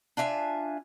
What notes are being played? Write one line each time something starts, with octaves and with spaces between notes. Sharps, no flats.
D4 F4 E5 G#5